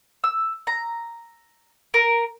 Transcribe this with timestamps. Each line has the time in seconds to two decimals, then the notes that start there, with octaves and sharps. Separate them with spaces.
0.24 E6
0.67 A#5
1.94 A#4